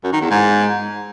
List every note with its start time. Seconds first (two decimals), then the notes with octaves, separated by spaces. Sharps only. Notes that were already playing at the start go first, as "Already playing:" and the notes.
0.04 F#2
0.13 D#3
0.22 E2
0.30 G#2